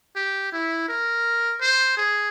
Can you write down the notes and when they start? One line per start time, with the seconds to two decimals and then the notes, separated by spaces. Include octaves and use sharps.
0.16 G4
0.52 E4
0.88 A#4
1.61 C5
1.97 G#4